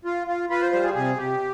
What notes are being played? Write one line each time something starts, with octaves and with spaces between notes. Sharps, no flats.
F4
F4
F4 B4
C5
G3 C5
G#4
C3 G#4
C3 G4